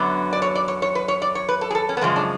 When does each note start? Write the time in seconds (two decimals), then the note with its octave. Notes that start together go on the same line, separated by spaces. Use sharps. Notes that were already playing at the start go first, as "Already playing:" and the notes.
Already playing: F#2 D3 F#3 B3
0.33 D5
0.42 C#5
0.55 D5
0.68 C#5
0.82 C#5
0.95 B4
1.08 C#5
1.22 D5
1.35 C#5
1.49 B4
1.61 A4
1.71 G#4
1.75 A4
1.89 C#4
1.97 B3
2.01 F#2 C#3 F3 G#3 C#4
2.16 D4